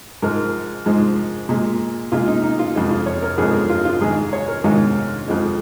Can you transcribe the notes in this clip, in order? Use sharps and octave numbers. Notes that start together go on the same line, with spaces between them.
G#2 F3 G#3 A#4
G#2 F3 G#3
A#2 G#3
A#2 G#3 F4
D#4
D#4
F4
F2 F3 G#3
F4
C#5
A#4
F2 F3 G#3 G#4
A#4
F4
F4
G#2 D#3 G#3 G#4
C#5
A#4
G#2 D#3 G#3 F4
F2 F3 G#3